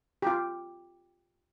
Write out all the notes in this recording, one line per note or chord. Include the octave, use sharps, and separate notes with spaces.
F4 G4